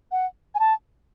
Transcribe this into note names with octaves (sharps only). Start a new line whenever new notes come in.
F#5
G#5
A5